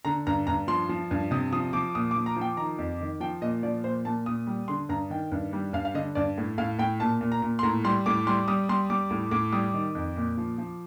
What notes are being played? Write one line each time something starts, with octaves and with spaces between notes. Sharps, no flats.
D3 A#5
G2 A#5
G2 A#5
F3 C6
F3
G2
C3 D#6
F3 D#6
F3 D6
A#2 D#6
D6
F3
A#5
F3 G5
D#3 A#5
F2
D#3
F3 G5
A#2 D#5
F3 D5
A#2 C5
A#2 A5
A#2 D#6
G3
D3 C6
G2 A#5
D#3 G5
G2
G3
G2 F5
F5
D3 D#5
G2 D5
A2
A2 F5
A2 G5
A#2 A5
A#2
A#5
A#2
C6
A2 A#5
G3 C6
A2 D6
G3 C6
G3 D#6
G3 C6
G3 D6
A2
A2 D6
G3 D#6
D#3
F2
A#2
F3
F3